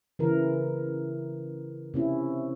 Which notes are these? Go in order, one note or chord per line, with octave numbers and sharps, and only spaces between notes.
C#3 E3 A#4
C3 C#4 E4